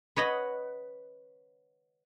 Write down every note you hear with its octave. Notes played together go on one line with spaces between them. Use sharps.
B4 C#5 D#5 F#5